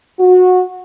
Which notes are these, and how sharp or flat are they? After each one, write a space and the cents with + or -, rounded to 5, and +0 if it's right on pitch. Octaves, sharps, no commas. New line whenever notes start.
F#4 -20